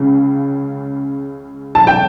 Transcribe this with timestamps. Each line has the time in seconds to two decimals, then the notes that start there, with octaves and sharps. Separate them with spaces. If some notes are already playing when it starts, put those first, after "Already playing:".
Already playing: C#2 C#3
1.75 A5
1.87 G5